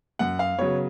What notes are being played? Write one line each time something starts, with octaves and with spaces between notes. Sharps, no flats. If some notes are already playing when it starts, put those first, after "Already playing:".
F#2 F#5
F5
C#3 F#3 B3 C#5